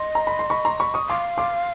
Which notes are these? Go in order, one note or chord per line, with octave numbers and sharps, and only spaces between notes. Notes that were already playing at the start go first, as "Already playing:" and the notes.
Already playing: D#5 C6
A#5
B5
C6
B5 C#6
A#5 C6
B5 C#6
C#6 D#6
F5 C6 D6
C6 D6